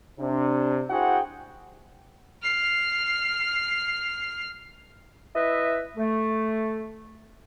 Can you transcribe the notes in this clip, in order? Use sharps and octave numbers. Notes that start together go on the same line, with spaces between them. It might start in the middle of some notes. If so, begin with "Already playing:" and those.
C3 D4
E4 F#4 G#4 C5 F#5 G5
F6 C7
E4 B4 D#5 E5
A3